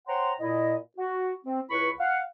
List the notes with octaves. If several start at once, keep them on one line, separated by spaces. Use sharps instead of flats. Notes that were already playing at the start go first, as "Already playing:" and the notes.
C5 C#5 F#5 G5 A#5 C6
A#2 E4 D#5
F#4
C4
C#2 E4 B4 B5 C#6
F5 F#5